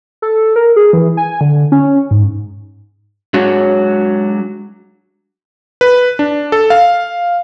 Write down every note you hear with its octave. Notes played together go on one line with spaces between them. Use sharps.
A4
A#4
G#4
E3
G#5
D3
C#4
G#2
F#3 G#3 D4 F#4 C#5
B4
D4
A4
F5